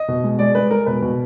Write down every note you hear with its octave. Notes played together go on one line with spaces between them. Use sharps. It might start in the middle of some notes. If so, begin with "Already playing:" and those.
Already playing: D#5
B2
G#3
G#3 D5
G#3 B4
G#3 A#4
B2 B4
B2